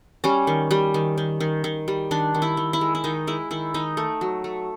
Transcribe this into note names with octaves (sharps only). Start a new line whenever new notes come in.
G3 C#4
D#3
G3
D#3
D#3
D#3
D#3
G3
D#3 D4
D#3
E4
D#3
E4
G#3
E4
D#3 D#4
G#3 E4
D#3 E4
D#3 D#4
A3
F#3
A3